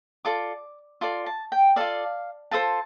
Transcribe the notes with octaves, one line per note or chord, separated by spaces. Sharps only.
F4 A4 D5 D6
F4 A4 D5 C6
A5
G5
F4 A4 D5 F5
F4 A4 C5 A5